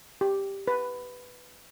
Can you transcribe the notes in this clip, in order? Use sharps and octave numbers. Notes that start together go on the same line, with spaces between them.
G4
B4